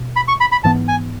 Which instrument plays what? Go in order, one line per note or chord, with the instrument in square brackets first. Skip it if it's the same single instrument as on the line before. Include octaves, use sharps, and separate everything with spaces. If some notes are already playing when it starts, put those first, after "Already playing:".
Already playing: [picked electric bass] B2
[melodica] B5
C#6
B5
B5
[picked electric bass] G#2 E3 B3 [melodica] A5
[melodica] G#5